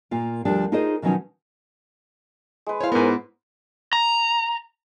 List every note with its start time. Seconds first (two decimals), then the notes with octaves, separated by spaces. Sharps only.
0.11 A#2 A#3 F4
0.45 D2 F3 G3 D4 A#4
0.72 D#4 F4 G#4 A#4 C5 D#5
1.02 B2 D#3 F3 F#3 C#4 D#4
2.66 G#3 B4
2.80 E4 C5 C#5 F5
2.92 G#2 B3 A#4 G#5
3.93 A#5